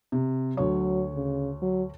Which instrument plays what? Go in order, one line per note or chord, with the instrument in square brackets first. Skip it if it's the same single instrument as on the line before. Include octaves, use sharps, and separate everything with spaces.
[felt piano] C3
[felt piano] D2 C#5 [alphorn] F#3
[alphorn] C#3
F#3